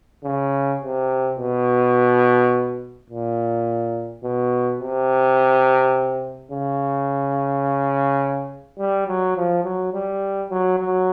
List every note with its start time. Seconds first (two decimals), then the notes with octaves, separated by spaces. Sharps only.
0.24 C#3
0.82 C3
1.39 B2
3.10 A#2
4.23 B2
4.80 C3
6.51 C#3
8.79 G3
9.07 F#3
9.36 F3
9.64 F#3
9.93 G3
10.50 F#3
10.79 F#3